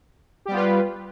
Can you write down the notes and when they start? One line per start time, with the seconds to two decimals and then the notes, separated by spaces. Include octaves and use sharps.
0.46 G4
0.48 G3
0.51 B3
0.54 F4
0.57 B4